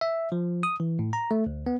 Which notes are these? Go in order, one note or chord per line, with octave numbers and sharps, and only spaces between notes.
E5
F3
D#6
E3
A2
A#5
A3
D2
B3